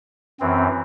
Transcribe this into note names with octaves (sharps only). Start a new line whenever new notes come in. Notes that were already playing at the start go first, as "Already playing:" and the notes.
F#2 E3 C4